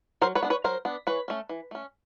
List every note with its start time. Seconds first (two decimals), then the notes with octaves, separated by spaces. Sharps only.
0.22 F#3 A#4 C5
0.35 B4 C#5
0.43 B3 D4
0.50 B4 C#5
0.64 F#3 A#4 C5
0.85 B3 D4
1.07 E3 B4 C#5
1.28 A3 C#4
1.49 E3
1.71 A3 C#4